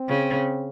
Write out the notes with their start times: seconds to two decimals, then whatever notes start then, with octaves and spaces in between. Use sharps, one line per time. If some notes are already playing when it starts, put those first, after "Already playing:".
Already playing: C4
0.08 C#3